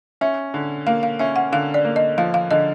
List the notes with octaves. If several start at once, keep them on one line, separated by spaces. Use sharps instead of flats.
C#4 E5
D3
A#3 F5
F5
C#4 E5
F#5
D3 F5
D5
A#3
D#5
F3 F5
F5
D3 D#5